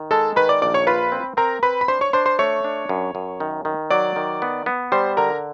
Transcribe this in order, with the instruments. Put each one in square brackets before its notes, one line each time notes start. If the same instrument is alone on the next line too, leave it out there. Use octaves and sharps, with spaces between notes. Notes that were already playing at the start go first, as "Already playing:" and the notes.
Already playing: [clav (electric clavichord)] D#3
[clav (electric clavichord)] G#3 [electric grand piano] A4 A5
[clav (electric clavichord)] D#3 [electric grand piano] B4 B5
[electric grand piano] D5 D6
[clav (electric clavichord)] A#1 [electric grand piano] D5 D6
[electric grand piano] C#5 C#6
[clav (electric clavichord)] F4 [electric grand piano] B4 B5
[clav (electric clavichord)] C4
[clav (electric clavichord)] C4 [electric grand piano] A#4 A#5
[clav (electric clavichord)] C4 [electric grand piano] B4 B5
[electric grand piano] B5
[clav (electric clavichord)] D4 [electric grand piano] C5 C6
[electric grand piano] C#5 C#6
[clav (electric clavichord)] D4 [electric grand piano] C5 C6
[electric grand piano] C5 C6
[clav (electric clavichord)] A3 [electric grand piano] C#5 C#6
[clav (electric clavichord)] D4
F#2
F#2
D#3
D#3
[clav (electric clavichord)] F#3 [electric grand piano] D5 D6
[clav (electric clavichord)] D#3
B3
B3
[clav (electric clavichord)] G3 [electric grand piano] C5 C6
[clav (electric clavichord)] D3 [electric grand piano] A#4 A#5